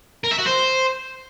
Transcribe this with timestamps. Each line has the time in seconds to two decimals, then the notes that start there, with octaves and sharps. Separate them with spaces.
0.24 A#4
0.31 E5
0.39 F#4
0.46 C5